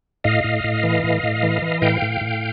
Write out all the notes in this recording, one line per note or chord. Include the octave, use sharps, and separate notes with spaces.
A2 D#5 F5
A2
A2
E3
A2
A2
E3
E3
A2 F5 G5
A2
A2